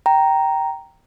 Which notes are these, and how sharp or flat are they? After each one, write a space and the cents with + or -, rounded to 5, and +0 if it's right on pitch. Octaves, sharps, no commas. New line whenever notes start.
G5 -10 A#5 +0